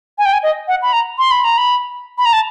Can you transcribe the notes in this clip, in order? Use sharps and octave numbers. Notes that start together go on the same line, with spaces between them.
G#5
G5
G#5
D#5
F#5
B5
A#5
C6
B5
A#5
B5
B5
A#5
A5